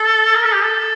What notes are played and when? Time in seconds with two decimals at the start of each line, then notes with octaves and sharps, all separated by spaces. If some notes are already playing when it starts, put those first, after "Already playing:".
Already playing: A4
0.35 A#4
0.44 A4
0.54 G4
0.64 A4